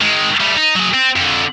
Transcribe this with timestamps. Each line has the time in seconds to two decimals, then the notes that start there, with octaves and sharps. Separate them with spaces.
0.01 D#3 G#3
0.40 G3 A3
0.57 D#4
0.76 F#3 G#4
0.94 C4
1.16 F2 D3